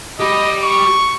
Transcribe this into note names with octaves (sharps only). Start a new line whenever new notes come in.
G4 D#5 B5
C#6